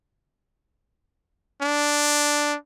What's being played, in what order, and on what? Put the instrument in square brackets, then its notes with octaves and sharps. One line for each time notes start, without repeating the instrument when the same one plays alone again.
[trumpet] D4